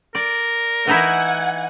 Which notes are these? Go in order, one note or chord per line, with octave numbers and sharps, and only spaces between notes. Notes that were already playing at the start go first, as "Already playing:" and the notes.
A#4 D5
E3 D#4 E4 F#5 G#5